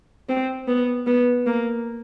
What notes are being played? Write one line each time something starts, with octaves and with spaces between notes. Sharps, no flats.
C4
B3
B3
A#3